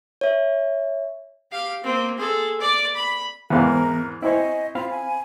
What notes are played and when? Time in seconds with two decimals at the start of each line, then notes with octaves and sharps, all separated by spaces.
0.21 C#5 E5
1.52 G4 F5
1.83 A#3 C4
2.17 G#4 A4
2.60 D5 D6
2.95 B5
3.50 E2 G#2 E3 B3 C4 A#4 F5
4.22 C4 E4 C5 D#5 G#5 C#6
4.75 C4 F4 F5 B5
4.91 G#5